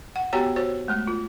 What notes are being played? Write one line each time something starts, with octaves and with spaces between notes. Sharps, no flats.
F#5
B3 F#4 G4 C#5 G5 A#5
F#4 C5 C#5
G#3 A3
F4